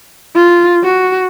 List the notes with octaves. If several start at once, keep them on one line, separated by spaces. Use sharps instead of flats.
F4
F#4